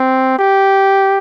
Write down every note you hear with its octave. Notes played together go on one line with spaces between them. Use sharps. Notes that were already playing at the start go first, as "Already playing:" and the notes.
Already playing: C4
G4